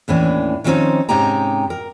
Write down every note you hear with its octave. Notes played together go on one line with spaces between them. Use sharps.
D#2 A2 E3 C#4 D4
D#3 F3 G3 C4 C#4 D#4
G#2 C3 C#4 D#4 G4 A#5
A#4